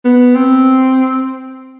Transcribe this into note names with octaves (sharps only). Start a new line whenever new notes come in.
B3
C4